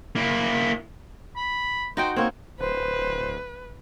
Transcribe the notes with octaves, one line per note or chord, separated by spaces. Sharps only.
A#3 E4
B5
D#4 F#4 C5 G5
A#3 C4 C#5
D1 B4 C5